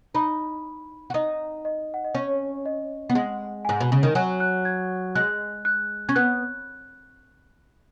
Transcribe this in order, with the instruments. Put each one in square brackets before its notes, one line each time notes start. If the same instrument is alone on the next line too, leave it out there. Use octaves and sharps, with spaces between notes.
[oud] D#4 [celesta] B5
[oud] F#4
[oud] D#4 [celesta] D#5
[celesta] D#5
F#5
D#5
[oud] C#4 [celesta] C#5
[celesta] D#5
[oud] B3
[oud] G#3 [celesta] F#5
[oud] G#2 [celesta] G#5
[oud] B2
C#3
D#3
[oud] F#3 [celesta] G#5
[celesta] F#6
G#6
[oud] G#3 [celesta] F#6
[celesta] F#6
[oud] C#4 [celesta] G#6
[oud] B3 [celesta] F#6